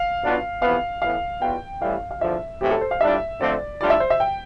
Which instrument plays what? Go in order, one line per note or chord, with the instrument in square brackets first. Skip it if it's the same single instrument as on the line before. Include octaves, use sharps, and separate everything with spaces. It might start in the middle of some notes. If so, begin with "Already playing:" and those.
Already playing: [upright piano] F5
[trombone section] B1 B2 B3 D4 F4
[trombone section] F2 C3 E3 B3 [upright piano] F5
[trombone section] A2 E3 B3 [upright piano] F5
[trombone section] E2 B2 B3 F4 [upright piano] G5
[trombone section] A1 A2 E3 G3 [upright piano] F5
[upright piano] F5
[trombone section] E2 D3 F3 [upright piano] E5
[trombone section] B1 A2 E3 A3 C4 [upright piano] G4
[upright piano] A4
C5
F5
[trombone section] A2 G3 D4 F4 [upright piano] E5
[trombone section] F2 D3 F3 A3 C4 [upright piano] D5
[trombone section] A1 A2 G3 D4 F4 [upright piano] D5
[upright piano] E5
C5
E5
G5